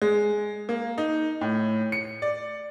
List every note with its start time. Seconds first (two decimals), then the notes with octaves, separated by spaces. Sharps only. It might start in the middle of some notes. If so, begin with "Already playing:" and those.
0.02 G#3
0.69 A#3
0.98 D#4
1.41 A2
1.92 C#7
2.22 D5